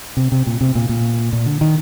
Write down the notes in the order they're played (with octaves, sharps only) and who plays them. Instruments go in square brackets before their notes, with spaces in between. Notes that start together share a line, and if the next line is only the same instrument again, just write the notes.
[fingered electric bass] C3
C3
A#2
C3
A#2
A#2
A#2
D3
D#3